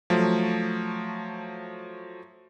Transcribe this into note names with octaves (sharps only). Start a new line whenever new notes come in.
F3 F#3 A3